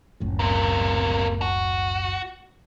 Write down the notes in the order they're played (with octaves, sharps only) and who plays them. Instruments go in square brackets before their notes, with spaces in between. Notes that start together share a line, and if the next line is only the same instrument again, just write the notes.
[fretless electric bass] F#1 C#2 A2
[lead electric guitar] C3 A#3
F#4